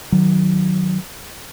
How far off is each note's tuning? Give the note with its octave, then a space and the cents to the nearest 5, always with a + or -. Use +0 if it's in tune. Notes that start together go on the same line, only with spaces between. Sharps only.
D#3 +0 F#3 +0